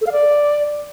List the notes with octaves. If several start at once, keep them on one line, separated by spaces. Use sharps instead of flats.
A4
F5
D5